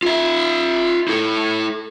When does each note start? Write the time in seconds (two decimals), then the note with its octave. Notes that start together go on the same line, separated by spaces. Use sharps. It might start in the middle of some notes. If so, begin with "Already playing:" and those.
0.03 F4 E5
1.08 E4 A4